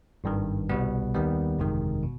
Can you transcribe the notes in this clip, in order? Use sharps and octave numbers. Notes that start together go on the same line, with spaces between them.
G#1 G2 D#3
C2 B2 G3 B3
D#2 D#3 G3 B3
G1 F2 C3 D#3 G#3
B2